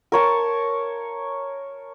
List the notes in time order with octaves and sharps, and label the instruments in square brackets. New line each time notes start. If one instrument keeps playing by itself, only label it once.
[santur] A#4 C#5 A5